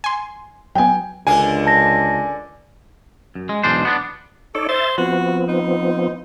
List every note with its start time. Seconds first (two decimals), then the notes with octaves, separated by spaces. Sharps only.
0.04 G#5 C6
0.75 F#3 B3 G5 G#5
1.27 C#2 D3 D4 A#4 G#5
1.67 A5 A#6
3.35 F#2
3.49 G#3
3.63 B1 E2 G#3 D4 C5
3.85 B3 D4
4.55 D#4 A4 C#5 D5
4.69 C5 E5 A6
4.98 F3 B3 C4 F#4
5.48 D#4